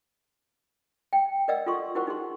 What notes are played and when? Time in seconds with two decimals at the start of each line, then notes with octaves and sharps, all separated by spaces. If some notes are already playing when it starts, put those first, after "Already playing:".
1.13 G5
1.48 A#4 D5 D#5 F#5 E6
1.66 F4 A4 C6 C#6
1.95 E4 F#4 A#4 C5 F#5 C#6
2.07 D#4 G#4 C6